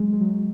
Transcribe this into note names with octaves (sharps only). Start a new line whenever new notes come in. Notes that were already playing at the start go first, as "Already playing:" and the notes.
Already playing: F#3 G#3
G#3
F#3